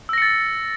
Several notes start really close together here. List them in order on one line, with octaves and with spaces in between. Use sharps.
E6 A#6 C#7 A6